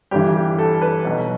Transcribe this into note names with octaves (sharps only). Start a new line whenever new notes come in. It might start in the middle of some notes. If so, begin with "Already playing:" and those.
G1 G2 E3 G4
G4
A4
B4
B1 B2 F#3